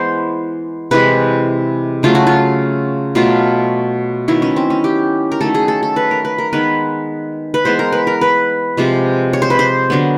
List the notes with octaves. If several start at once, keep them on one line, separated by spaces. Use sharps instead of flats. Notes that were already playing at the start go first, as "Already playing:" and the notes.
Already playing: E3 G#3 B3 C5
C3 E3 G#3 B4
C#3 F#3 A3 F4
F#4
F4
B2 F#3 A3 F4
D#3 F#3 B3 E4
C#4
C4
C#4
G4
A#4
D#3 F#3 A3 A4
G#4
A4
A4
B4
A#4
B4
A#4
D#3 G#3 B3 B4
B4
E3 G#3 B3 C5
A#4
B4
A#4
B4
C3 F3 G#3
C#5
C5
B4
C5
D3 F#3 B3